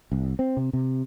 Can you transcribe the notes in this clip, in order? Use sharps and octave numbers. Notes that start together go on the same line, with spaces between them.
C2
C4
C3
C3